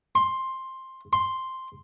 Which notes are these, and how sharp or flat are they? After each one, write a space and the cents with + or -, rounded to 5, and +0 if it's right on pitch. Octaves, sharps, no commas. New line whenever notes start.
C6 +10
C6 +0